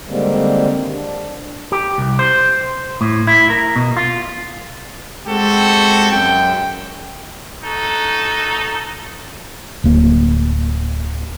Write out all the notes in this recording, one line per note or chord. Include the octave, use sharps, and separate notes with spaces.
D3 D#3 G3 G#3 A#3 C4
D4
G4
C2
C5
A2
E4
A#4
B2
F4
G#3 C4 F#4 G4 A4
F#2 G5
D#4 F#4 A4
D1 A#3